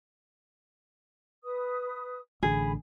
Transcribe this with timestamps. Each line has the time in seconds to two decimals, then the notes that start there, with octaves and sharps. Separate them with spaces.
1.44 B4 D#6
2.43 A1 D3 G#4 B5